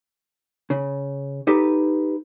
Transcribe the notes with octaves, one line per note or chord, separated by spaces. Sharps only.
C#3
D#4 G4 A4 B4